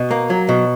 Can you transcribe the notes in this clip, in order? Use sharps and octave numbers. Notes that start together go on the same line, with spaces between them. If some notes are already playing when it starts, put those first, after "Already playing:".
Already playing: B2
A#3
F#3
B2